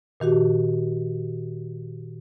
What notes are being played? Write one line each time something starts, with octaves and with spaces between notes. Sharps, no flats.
A#2 D#3 F#4 G4